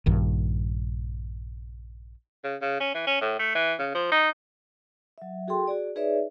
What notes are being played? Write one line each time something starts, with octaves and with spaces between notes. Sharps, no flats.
A#1 G2 D#3
C#3
C#3
C#4
E3
C#4
A2
A3
E3
C#3
F3
D#4
F#3 E5
F#4 G#4 A4 G5 C6
F#4 G#4 D5
D#4 G#4 B4 C#5 D5 E5